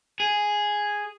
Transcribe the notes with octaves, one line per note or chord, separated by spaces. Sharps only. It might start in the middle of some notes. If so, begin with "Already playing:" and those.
G#4